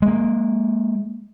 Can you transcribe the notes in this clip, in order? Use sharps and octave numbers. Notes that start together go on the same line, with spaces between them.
G#3 A#3